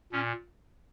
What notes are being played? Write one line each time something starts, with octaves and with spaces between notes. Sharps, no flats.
A#2 C#4